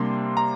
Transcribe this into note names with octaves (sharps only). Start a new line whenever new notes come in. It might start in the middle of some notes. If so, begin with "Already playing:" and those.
Already playing: C3 G3 A#3 D4 C6
A#5